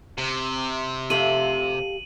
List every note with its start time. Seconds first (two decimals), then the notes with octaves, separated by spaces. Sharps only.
0.18 C3
1.10 F2 A3 G4 A4 F5 D#7 F#7